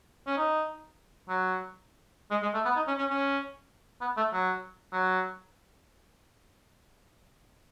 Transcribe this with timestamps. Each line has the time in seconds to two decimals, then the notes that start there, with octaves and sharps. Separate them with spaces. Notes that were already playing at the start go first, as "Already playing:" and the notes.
0.27 C#4
0.37 D#4
1.29 F#3
2.31 G#3
2.43 G#3
2.54 A3
2.65 B3
2.76 D#4
2.88 C#4
2.98 C#4
3.10 C#4
4.01 B3
4.17 A3
4.33 F#3
4.93 F#3